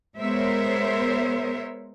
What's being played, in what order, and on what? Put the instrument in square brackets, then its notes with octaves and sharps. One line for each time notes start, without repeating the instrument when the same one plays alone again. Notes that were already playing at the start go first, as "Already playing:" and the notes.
[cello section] G#3 B3 A#4 C5 C#5 E5